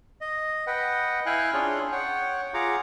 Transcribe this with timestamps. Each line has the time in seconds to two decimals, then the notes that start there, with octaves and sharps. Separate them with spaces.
0.21 D#5
0.67 B4 D#5 F#5 G5
1.26 E4 F5 G5 G#5 F#6
1.54 C#4 D4 F4 G#4 C#5 C6
1.92 C#5 F#5 G5
2.54 F4 G#4 F#5 A#5 D6